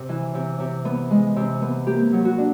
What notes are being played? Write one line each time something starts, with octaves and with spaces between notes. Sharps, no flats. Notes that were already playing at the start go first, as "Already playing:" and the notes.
Already playing: C3
E3
C3
C3
B3
G#3
C3
B3
A#3 G4
F#3
F#4
D4